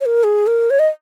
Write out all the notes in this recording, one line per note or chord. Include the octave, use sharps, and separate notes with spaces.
C#5
A#4
G#4
A#4
C#5
D#5